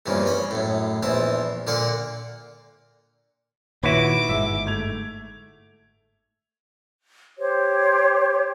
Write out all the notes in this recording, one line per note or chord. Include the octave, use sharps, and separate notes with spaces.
E2 G2 C#3 F3 A#3
C#4 D#5 B5
F#2 A2
A#1 E2 F3 E4 A5 D#6
A#2 D3 A#3 F5 F#5 A#5
A#2 D#3 E4 F#4 B4 C#5 D6
G1 G#2 G#3 E5
A3 G#6 F7
G4 C5 C#5